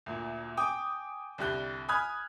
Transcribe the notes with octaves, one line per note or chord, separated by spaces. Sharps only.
D2 A#2
G5 G#5 D6 D#6
C2 D3 G4 F#6 G7
G#5 B5 D#6 F6 F#6 G#6